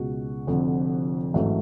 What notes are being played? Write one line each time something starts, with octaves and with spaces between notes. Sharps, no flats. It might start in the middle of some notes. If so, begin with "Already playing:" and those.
Already playing: C#2 B2 G#3 F#4
F1 F2 D3
A1 G#2 F#3 A3